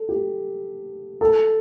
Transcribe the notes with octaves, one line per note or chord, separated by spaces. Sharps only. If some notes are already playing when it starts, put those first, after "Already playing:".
Already playing: A4
G4
A4